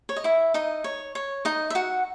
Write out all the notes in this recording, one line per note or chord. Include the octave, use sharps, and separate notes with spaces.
C#5
D#5
E4 E5
D#4 D#5
C#5
C#5
D#4 D#5
E5
F#4 F#5